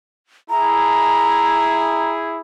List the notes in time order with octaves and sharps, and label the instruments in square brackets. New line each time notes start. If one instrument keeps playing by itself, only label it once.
[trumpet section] E4 G#4 [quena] A#5